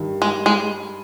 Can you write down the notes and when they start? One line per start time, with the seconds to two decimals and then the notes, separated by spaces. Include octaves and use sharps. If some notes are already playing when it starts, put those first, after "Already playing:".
Already playing: G2 D#3
0.22 G#3
0.46 G#3